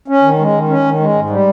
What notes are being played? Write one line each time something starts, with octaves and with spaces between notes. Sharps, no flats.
C#4
D#3
G#3
D#3
C#4
D#3
G#3
G#2
G3